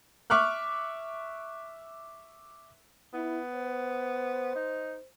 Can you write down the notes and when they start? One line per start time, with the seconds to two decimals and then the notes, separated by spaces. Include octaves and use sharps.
0.30 E5 C#6 D6 F6 F#6
3.13 B3 E4
3.55 C5
4.55 D#4